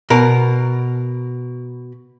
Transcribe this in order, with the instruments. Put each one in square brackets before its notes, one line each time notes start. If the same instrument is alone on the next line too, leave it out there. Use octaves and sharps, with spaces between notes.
[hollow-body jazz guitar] B2 A#4